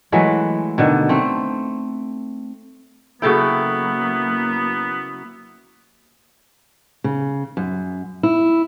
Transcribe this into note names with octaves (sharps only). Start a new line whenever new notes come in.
E3 F#3 G#3 A3
B2 D3 D#3
A3 C4
C#3 F#3 A#3 B3 E4 F#4 A4 G5
C#3
F#2
E4